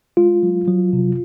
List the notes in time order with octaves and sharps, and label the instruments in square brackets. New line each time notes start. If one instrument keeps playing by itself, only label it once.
[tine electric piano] G#3 F4
F#3
F#3
C3